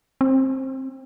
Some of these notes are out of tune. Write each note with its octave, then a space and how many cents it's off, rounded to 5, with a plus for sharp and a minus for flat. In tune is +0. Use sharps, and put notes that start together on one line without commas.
C4 +20